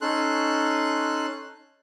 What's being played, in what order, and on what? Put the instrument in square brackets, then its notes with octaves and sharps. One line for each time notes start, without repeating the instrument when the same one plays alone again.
[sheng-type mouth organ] C#4 D#4 A4 C6 F#6